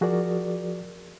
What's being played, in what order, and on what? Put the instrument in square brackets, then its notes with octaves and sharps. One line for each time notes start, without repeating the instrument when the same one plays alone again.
[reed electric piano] F3 F#4 G#4 A#4 D5